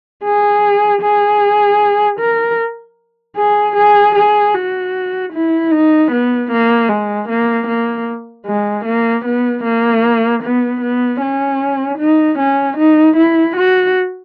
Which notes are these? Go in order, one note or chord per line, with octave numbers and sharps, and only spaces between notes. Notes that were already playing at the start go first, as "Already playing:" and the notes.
G#4
G#4
A#4
G#4
G#4
G#4
F#4
E4
D#4
B3
A#3
G#3
A#3
A#3
G#3
A#3
B3
A#3
B3
B3
C#4
D#4
C#4
D#4
E4
F#4